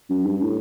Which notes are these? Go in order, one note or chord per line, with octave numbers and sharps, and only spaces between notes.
F#2
G2
A2